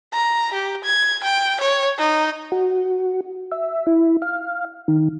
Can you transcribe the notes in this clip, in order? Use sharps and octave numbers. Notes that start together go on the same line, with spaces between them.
A#5
G4
G#6
G5
C#5
D#4
F#4
E5
E4
F5
D#3